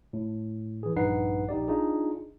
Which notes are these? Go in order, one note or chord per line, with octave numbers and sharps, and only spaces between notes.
A2
E3 G#4
A#1 G2 D#4 B4 F#5 C7
A#1 D#4 G4 D5
D4 D#4 F4 G#4